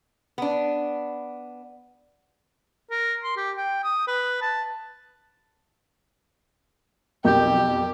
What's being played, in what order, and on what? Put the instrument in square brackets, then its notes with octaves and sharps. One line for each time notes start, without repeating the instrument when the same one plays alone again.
[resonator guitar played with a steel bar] B3 D4
[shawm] A#4
C6
G4
G5
D#6
B4
A5
[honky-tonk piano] B1 F2 B2 [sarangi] G4 [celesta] A#4 G6